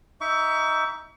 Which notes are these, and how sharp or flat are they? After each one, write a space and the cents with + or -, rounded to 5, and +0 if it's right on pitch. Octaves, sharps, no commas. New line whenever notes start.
D#4 +10 E5 +0 C#6 +35